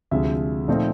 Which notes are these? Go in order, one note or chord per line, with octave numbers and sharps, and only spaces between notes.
D2 C3 F3 G#3 E5
A#2 F3 A3 C4 D#4